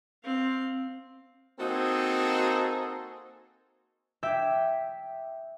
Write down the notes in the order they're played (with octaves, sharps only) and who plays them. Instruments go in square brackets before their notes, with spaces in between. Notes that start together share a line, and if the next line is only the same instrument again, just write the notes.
[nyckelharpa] C4 F5
[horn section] A#3 C4 D#4 F#4 G#4 A4
[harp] E5 G5 D6 G6 G#6 B6